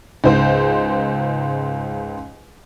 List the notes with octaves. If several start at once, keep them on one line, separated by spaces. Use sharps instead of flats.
C#2 G#2 C5